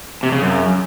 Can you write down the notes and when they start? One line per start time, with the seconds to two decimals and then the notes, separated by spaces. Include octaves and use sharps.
0.23 C3
0.32 C#3
0.42 F#2